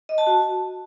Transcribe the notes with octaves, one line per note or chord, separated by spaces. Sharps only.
D#5
A5
F#4